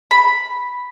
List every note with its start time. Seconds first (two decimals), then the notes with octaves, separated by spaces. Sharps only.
0.11 B5